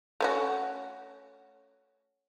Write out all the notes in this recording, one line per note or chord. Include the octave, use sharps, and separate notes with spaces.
A3 C#4 F#4